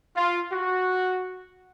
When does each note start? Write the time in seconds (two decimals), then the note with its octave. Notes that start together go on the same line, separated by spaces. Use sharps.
0.16 F4
0.51 F#4